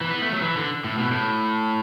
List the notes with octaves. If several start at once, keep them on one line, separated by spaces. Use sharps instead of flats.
E3
B3
A3
F#3
E3
D3
A2
B2
A2